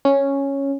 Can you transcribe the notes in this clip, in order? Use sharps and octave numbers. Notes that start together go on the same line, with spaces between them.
C#4